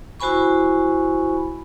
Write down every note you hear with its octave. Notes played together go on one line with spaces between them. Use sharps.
E4 F#4 C5 G#5 B5 C#6